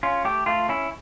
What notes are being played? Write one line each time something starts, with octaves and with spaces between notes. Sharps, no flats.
C#4 F4
A3 G4
A3 F4
C#4 E4